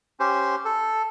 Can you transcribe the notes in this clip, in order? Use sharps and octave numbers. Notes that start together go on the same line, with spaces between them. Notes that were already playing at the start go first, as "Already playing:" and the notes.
C#4 G4 C5
A4